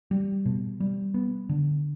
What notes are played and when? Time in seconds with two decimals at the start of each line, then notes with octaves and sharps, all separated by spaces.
0.11 G3
0.45 B2
0.80 G3
1.14 B3
1.49 D3